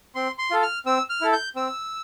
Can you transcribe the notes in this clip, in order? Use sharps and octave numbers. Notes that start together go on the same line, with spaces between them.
C4 C6
C6
F4 A4
F6
C4 E6
F6
E4 A4
G6
C4 E6